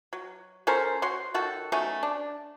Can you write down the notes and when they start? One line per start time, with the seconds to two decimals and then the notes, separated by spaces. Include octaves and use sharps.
0.13 F#3
0.67 C#4 A4 A#4 C5
1.02 F#4 C#5 C6
1.34 D#3 F#4 A4
1.72 F#3 A3 C#4 D#4
2.03 D4